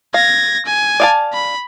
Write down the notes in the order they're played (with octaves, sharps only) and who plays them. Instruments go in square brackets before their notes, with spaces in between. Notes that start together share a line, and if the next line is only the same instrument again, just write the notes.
[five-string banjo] F5 [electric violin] G#6 A#6
[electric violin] G#5
[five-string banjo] D5 F5 A5
[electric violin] B5